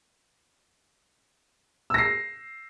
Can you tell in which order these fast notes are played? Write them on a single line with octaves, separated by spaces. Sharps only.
E6 A#6 C7